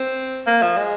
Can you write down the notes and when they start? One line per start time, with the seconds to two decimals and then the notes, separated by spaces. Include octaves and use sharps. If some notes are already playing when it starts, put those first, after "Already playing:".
Already playing: C4
0.47 A#3
0.62 F3
0.77 G#3